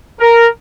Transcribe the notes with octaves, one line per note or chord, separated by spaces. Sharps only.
A#4